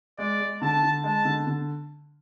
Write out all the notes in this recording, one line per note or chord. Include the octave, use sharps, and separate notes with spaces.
G#3 D5
G#3
D3 A5
D3
G#3 A5
D3
D3